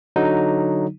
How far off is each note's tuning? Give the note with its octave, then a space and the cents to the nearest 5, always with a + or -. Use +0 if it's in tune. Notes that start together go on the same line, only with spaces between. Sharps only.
D3 +0 F#3 +0 D#4 +0